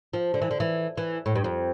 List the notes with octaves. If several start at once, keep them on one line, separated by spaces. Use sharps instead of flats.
F3
D3
E3
D3
E3
E3
A2
G2
F2